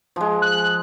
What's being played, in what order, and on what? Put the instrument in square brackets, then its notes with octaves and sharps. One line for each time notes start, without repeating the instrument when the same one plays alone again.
[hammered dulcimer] F3 G#3
[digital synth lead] F#6